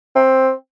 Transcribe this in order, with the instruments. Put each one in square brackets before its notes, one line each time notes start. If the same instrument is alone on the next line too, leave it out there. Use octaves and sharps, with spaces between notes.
[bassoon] C4